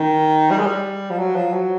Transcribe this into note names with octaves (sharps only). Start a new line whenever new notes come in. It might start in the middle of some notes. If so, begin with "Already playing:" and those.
Already playing: D#3
G3
G#3
G3
F3
F#3
F3
F#3